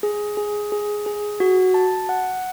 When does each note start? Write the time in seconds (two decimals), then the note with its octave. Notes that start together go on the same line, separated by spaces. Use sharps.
0.03 G#4
0.37 G#4
0.72 G#4
1.06 G#4
1.40 F#4
1.74 A5
2.09 F#5